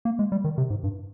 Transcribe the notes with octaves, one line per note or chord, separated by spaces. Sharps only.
A#3
G#3
G3
D#3
C3
G#2
G2